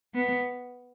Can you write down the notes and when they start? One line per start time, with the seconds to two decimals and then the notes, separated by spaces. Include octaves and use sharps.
0.14 B3